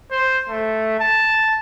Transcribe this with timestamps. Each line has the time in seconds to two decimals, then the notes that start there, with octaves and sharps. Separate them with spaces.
0.11 C5
0.49 A3
1.00 A5